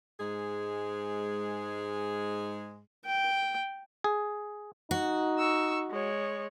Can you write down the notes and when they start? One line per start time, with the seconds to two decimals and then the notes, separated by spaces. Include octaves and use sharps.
0.20 G#2 G#3 G#4
3.05 G5
4.04 G#4
4.91 D#4 F#4
5.38 C#6 E6
5.90 G#3 C#5